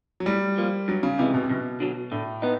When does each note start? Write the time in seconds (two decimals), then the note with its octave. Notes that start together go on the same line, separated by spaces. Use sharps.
0.20 F#3
0.26 A2 G3
0.58 F3 A#3
0.88 G2 F#3
1.03 C#3
1.19 C3 E3 G#3
1.34 B2
1.43 C3
1.49 F#2 B2
1.80 D3 F#3
2.11 A2 D3
2.42 B3 D#4